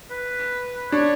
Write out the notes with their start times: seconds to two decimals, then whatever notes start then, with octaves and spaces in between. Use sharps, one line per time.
0.10 B4
0.92 D4 C#5